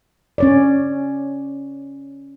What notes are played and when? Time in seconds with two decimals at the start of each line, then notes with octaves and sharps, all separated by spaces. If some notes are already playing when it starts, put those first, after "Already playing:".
0.38 C#4 C#5 D5